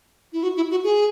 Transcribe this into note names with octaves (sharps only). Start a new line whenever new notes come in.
E4
F#4
E4
F#4
G#4